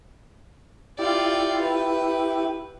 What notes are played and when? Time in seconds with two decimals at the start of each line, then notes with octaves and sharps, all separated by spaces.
0.99 E4 F4 G4 D5
1.62 B4